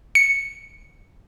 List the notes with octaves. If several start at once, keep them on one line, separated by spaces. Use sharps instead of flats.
C#7